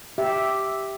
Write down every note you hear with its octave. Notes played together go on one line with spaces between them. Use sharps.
G4 E5